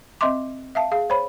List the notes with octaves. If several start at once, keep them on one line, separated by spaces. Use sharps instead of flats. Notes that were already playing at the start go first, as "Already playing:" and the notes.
C4 D#5 E5 C6 D6
E5 F5 A5
G#4 F5
C5 C#5 B5